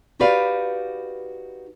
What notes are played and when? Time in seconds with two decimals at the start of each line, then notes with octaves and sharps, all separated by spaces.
0.20 D#4 F#4 G4 B4 D5 F5